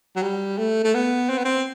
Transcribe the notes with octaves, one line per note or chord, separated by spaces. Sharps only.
F#3
G3
A3
A3
B3
C4
B3
C4